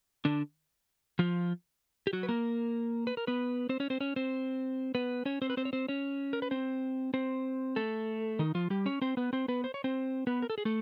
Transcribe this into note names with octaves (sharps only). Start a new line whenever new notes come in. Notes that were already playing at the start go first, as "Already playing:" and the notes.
D3 D4
F3 F4
G4
F#3 F#4
B4
A#3 A#4
B4
A#4
B3 B4
C4 C5
C#4 C#5
C4 C5
C#4 C#5
C4 C5
B3 B4
C#4 C#5
C4 C5
B4
C4 C5
C#5
C4 C5
C#4 C#5
A#4
B4
C4 C5
C4 C5
A3 A4
D#3 D#4
F3 F4
G3 G4
C#4 C#5
C4 C5
B3 B4
C4 C5
B3 B4
C5
C#5
C4 C5
B3 B4
A#4
A4
G#4
A3 A4